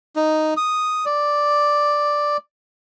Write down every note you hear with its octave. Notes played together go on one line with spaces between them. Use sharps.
D#4
D#6
D5